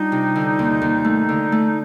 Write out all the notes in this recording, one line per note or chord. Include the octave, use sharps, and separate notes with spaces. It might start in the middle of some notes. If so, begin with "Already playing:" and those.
Already playing: G3 D4 D#4 F4
C3
D3
D#2
D#2
A3
D3
A3